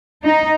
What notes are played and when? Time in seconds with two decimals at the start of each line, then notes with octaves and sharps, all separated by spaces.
0.24 D#4